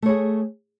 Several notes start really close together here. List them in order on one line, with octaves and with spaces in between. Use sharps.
A3 C#5 G#4